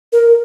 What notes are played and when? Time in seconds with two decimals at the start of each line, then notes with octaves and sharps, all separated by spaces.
0.13 A#4